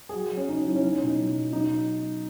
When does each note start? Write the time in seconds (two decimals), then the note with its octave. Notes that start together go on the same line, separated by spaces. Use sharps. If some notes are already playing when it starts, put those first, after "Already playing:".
0.09 G#4
0.14 F#3 F#4
0.31 F#3
0.37 C#4
0.49 C#3 D#4
0.66 F#3 E4
0.75 C#4
0.83 F#3 D#4
0.94 C#4
1.01 B2
1.07 D#4
1.18 F#3
1.35 B2
1.53 F#3 D#4